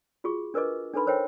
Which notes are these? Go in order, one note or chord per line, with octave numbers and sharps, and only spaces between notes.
F4 F#4 G#4 C#6
D4 A#4 B4 D#5 D6
D4 D#4 A4 B4 B5 C6
A#4 C5 C#5 E5 G5